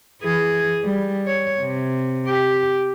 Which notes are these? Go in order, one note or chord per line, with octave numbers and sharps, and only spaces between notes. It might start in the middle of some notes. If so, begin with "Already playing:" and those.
E3 G#4
G3
C#5
C3
G4